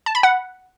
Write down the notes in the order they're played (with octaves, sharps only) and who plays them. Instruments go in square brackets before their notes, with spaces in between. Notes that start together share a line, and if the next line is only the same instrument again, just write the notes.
[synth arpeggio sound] A5
B5
F#5